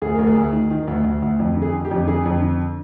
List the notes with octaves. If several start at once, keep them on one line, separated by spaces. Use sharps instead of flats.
D2 G#4
D2 A#4
G#4
D2
D#3
D#3
D2
D2
D2
F2
D3
G#4
D3
G4
F2
D3 G#4
F2
D3